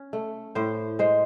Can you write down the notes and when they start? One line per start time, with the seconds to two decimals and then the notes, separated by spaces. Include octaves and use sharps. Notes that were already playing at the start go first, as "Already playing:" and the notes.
Already playing: C#4
0.13 A3
0.55 A2 C5
0.99 G#3 C5